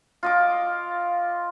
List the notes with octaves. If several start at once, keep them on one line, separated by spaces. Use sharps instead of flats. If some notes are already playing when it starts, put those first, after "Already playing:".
F4 D#5 D6